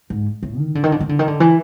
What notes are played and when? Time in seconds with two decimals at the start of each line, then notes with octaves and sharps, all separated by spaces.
0.10 G#2
0.43 A2
0.58 D#3
0.75 D3
0.83 D#3
0.92 D3
1.00 D#3
1.09 D3
1.19 D#3
1.28 D3
1.40 E3